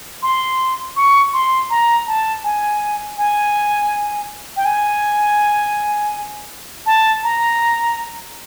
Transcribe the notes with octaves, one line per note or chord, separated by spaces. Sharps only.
C6
C#6
C6
A#5
A5
G#5
G#5
G5
G#5
A5
A#5